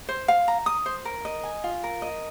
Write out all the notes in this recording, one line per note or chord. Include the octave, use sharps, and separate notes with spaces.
C5
F5
A#5
D#6
C5
A#4
D#5
G#5
F4
A#4
D#5